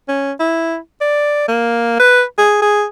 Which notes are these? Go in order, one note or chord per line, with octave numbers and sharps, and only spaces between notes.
C#4
E4
D5
A#3
B4
G#4
G#4